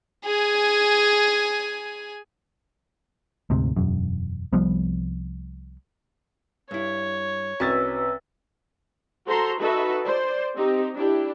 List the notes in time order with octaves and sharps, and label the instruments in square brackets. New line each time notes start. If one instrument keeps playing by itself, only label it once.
[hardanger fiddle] G#4 G#5
[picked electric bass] D2 G#2 C3
E1 F#2
C2 F3 G3 B3
[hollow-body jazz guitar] G2 E4 [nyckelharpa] C#5
[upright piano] C2 C#4 A6 [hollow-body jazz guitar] F#4 D#5 [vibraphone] B4 E6
[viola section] F#4 A4 C5 A#5 C6
D#4 F#4 A4 B4 E5
C5 D5
C4 D#4 G4
D4 E4 G4